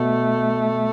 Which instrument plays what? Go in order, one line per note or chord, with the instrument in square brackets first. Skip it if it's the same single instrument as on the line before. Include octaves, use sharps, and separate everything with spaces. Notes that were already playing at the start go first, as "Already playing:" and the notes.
Already playing: [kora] B2 [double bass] A3